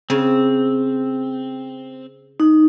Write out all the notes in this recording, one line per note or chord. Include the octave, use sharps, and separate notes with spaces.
C#3 C4
D#4